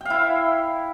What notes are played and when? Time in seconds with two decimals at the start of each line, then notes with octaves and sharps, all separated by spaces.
0.01 G5
0.05 F5
0.10 E4